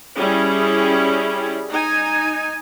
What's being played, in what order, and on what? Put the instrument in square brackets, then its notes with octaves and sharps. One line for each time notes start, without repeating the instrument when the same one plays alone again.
[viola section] G3 C#4 E4 G#4
D#4 G#5